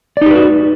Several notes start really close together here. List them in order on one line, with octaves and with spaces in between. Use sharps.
D5 D#4 G4 B4 F#4